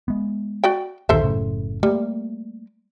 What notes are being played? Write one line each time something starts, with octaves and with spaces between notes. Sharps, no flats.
G#3 B3
F#4 D5 G5
D#1 A#1 D#3 A4 C5 E5
F#1 A2 C#3
G3 A3 A#3